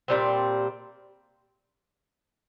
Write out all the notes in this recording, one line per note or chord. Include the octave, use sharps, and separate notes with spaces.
A#2 G3 C4